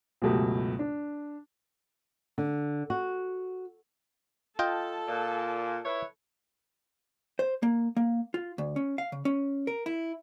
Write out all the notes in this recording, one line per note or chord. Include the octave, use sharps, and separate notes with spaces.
C#2 F#2 B2 A3 G4
D4
D3
F#4
F4 A4 D#5 G5 A5
A#2
E4 B4 C#5
C5
A#3
A#3
F4
D2
C#4
F5
C#3
C#4
A#4
E4